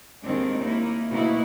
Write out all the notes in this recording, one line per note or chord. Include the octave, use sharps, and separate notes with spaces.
D#2 D#3 G#3 C4 D4
A#3 D#4 E4
D2 B2 A#3 D#4 E4 F#4